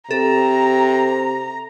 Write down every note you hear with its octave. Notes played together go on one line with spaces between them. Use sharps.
C3 A4 A#5